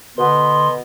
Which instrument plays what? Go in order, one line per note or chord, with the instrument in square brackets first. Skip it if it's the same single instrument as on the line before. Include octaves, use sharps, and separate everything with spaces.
[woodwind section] B2 B3 [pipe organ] D3 C6